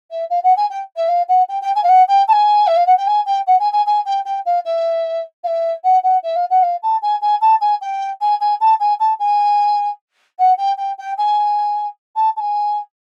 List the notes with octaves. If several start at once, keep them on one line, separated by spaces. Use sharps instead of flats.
E5
F5
F#5
G#5
G5
E5
F5
F#5
G5
G5
G#5
F5
F#5
G5
A5
G#5
E5
F5
F#5
G5
G#5
G5
F#5
G#5
G#5
G#5
G5
G5
F5
E5
F5
E5
F#5
F#5
E5
F5
F#5
F5
A5
G#5
G#5
A5
G#5
G5
G#5
G#5
A5
G#5
A5
G#5
F#5
G5
G5
G5
G#5
A5
A5
G#5